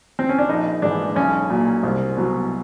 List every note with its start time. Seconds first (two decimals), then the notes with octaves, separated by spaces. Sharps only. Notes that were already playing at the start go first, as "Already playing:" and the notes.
0.19 C4
0.29 C#4
0.38 D4
0.49 A#1 D#4
0.82 G#2 E3 D4
1.16 B1 C#4
1.50 A#2 F#3
1.83 C2
2.17 B2 F#3